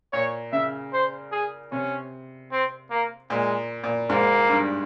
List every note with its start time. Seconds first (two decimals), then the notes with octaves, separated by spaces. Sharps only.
0.13 A#2 C#5
0.52 C#3 E5
0.93 C5
1.32 G#4
1.71 C3 C#4
2.51 C4
2.90 A#3
3.30 A#2 G#3
3.84 A#2
4.10 G#2 A#3
4.49 G2